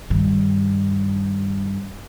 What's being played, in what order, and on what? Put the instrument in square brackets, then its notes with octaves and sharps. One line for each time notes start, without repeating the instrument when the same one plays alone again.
[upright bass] G2 D#3